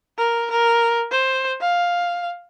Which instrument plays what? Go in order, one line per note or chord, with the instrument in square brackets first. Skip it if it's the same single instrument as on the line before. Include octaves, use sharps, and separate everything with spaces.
[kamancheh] A#4
A#4
C5
F5